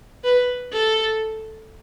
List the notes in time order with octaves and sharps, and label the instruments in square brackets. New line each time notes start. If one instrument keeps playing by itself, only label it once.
[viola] B4
A4